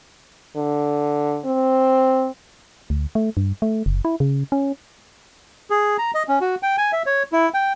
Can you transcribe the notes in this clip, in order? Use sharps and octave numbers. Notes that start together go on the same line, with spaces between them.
D3
C4
D2
A3
G2
A3
F#1
E4
C#3
C#4
G#4
A#5
D#5
C#4
F#4
G5
G#5
E5
C#5
E4
G5